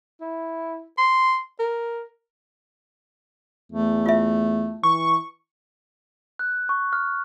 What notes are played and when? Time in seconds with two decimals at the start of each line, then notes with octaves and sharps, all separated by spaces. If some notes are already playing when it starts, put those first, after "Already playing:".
0.21 E4
0.97 C6
1.60 A#4
3.72 E2 A3
4.06 F4 E5
4.83 E3 C#6
6.39 F#6
6.69 C#6
6.93 F6